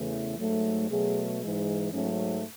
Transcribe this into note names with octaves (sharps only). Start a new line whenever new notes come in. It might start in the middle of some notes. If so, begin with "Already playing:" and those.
Already playing: E2 C#3 E3 A3
G#2 F#3 A3
B2 F#3 A3 G#4
G#2 E3 G#3
G#2 F#3 A3 C#4